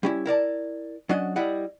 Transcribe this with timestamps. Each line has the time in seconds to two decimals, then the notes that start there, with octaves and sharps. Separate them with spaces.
0.03 G3 C#4 E4
0.26 E4 A#4 D5 A5
1.09 F#3 C#4 D4 F#4 D#5
1.36 G3 E4 D#5 F#5